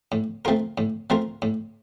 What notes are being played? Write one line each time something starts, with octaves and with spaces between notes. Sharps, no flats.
A2
A3 C4 F4 A#4
A2
A3 C4 F4 A#4
A2